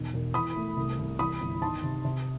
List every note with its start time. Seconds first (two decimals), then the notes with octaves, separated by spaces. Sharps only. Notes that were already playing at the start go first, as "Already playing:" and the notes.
Already playing: E1 D#3
0.14 E1
0.34 E3 B5 D#6
0.56 A3
0.77 C2
0.99 C2
1.19 E3 B5 D#6
1.41 G1
1.62 D#3 A5 C6
1.83 C3
2.05 C3